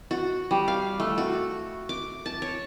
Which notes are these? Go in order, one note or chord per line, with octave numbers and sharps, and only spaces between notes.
F#4
G3
F5
A3
F#4
D6
A5
C#5